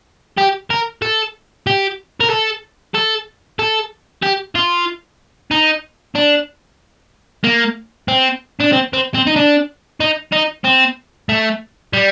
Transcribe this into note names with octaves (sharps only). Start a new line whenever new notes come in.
G4
A#4
A4
G4
A#4
A4
A4
A4
G4
F4
D#4
D4
A#3
C4
D4
C4
C4
C4
D#4
D4
D#4
D#4
C4
A3
G3